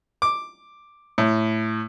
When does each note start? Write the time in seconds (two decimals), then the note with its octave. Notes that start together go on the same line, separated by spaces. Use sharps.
0.22 D6
1.18 A2